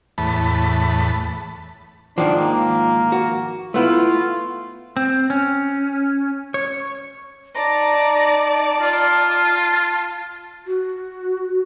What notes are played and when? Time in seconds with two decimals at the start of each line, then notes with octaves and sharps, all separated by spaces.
0.18 E2 A2 A5 B5
2.18 G#2 D#3 F3 D4
2.38 A#3
3.12 F#4
3.74 A3 B3 E4 F4
4.97 C4
5.30 C#4
6.54 C#5
7.56 D#4 D5 A5 A#5
8.82 F4
10.67 F#4